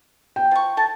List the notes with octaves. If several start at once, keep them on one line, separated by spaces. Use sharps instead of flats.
G5
F3 C#6
A4 A5